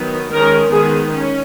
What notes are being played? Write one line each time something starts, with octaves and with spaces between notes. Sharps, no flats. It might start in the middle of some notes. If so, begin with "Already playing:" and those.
Already playing: D#3 F#3 B3
D#3 G#3 C#4 A#4
D#3 G#3 B3 G#4
C#4